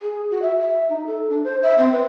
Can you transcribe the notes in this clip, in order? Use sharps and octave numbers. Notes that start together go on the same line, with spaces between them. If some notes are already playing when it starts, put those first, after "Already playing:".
G#4
F#4
E5
E5
D#4
A4
D4
C5
E5
C4
B4